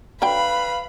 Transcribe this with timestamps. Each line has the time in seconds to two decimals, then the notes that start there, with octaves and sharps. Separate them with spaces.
0.22 D3 F#3 B4 F5 G5 B5